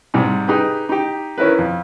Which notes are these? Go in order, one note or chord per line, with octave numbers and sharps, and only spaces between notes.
G#2 C3 G3
D#4 G4 G#4 B4
D#4 G4
D#3 C#4 E4 A#4 B4
F2